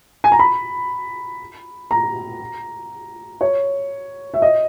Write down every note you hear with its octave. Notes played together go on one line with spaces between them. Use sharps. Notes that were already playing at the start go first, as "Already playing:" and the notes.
G#5
A#5
B5
A#5
C#5
E5
D#5